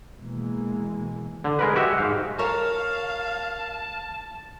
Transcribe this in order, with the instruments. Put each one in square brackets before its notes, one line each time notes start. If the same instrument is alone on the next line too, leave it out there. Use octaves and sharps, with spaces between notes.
[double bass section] B2 E3 G#3 A#3
[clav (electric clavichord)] D3
G#3 A#4 B4
F#4 G4 D#5 E5
G#2 F5
[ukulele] A#4 C#5 [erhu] F5 [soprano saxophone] A5